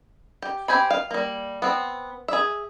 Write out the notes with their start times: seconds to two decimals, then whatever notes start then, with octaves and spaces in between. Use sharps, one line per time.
0.42 G4
0.68 C4 G4 G#5 B5
0.91 F5
1.11 G3 A#3
1.62 B3 C4
2.28 G#4 E5